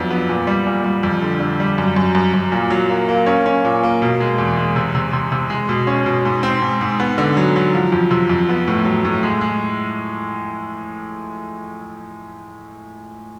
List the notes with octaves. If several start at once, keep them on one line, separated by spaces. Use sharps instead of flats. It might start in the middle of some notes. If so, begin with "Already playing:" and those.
Already playing: F2 F#3 B3 D4
B3
A#2
G3
A#2
G3
F2
D3
D3
G3
F#2
F#2
F#2
F#2
A#2
F#3
A#3
A#3
C#4
C#4
A#2
A#3
B2
G#3
E2
G#3
C3
C3
C3
C3
G#3
B2
C#4
B2
G#2
C4
G#2
G#2
B3
D3
F#3
F#3
F3
F2
C3
F2
B3
A2
F#3
A2
G#3
G#3